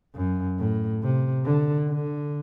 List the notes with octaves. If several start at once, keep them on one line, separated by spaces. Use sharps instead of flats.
F#2
A2
C3
D3
D3